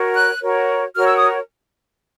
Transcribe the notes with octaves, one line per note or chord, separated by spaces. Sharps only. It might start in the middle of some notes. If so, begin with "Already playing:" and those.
Already playing: F#4 A#4 C#5
F#6
F#4 A#4 C#5
F#4 A#4 C#5 F6
E6
D#6